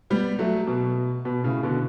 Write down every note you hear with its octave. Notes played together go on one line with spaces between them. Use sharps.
G3 B3
F#3 A3
B2
B2
A2 C#3
B2 D3